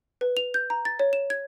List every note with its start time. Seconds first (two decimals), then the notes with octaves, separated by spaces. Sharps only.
0.21 B4
0.37 F7
0.54 G6
0.70 A#5
0.85 A6
0.99 C#5
1.13 E7
1.30 G#6